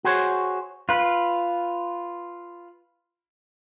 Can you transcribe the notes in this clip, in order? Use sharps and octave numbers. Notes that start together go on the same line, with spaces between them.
F#4 G#4 C5 C#5
F4 B4